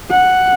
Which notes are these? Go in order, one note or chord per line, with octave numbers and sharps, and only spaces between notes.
F#5